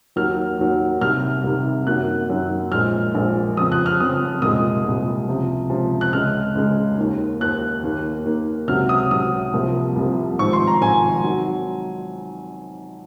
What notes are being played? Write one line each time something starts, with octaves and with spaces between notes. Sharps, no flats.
D#2 D#3 F#3 A#3 F6
D#2 D#3 F#3 A#3
C2 C3 D#3 F6
C2 C3 D#3
F#2 D#3 F#3 A#3 F#6
F#2 D#3 F#3 A#3
A#1 A#2 G#3 F6
A#1 A#2 G#3
F2 C#3 F3 D#6
F#6
F6
F2 C#3 F3 D#6
C2 A#2 G#3 D#6
C2 A#2 G#3
C#2 C3 F3
C#2 C3 F3
F#6
C#2 C#3 G#3 F6
C#2 C#3 G#3
D#2 D#3 A#3
D#2 D#3 A#3 F#6
D#2 D#3 A#3
D#2 D#3 A#3
C#2 C3 F#3 F6
D#6
C#2 C3 F#3 D#6
C2 C3 F3 A#3
C2 C3 F3 A#3
G#1 G#2 F3 C#6
C6
A#5
G#1 G#2 F3 G#5
D#3 F#3